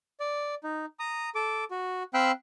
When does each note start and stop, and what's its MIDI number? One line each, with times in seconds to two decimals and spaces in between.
0.20 0.55 74
0.64 0.86 63
0.99 1.29 82
0.99 1.29 87
1.35 1.64 69
1.35 1.64 86
1.71 2.03 66
2.14 2.32 60
2.14 2.32 77
2.14 2.32 79
2.14 2.32 83
2.14 2.32 88
2.14 2.32 90